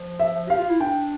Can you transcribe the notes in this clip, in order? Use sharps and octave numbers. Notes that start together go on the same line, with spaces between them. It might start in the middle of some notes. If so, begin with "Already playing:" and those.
Already playing: F3
E5
F3
G4 F5
F4
E4
D4 G5